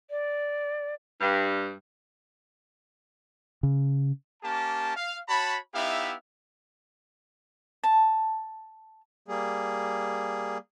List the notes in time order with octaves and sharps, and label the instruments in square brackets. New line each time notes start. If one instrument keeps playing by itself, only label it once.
[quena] D5
[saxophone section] G2
[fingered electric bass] C#3
[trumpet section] A#3 C#4 G4 A5
F5
F#4 C#5 A5 B5
B3 D#4 E4 G4 E5 F5
[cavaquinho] A5
[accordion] G3 A#3 G#4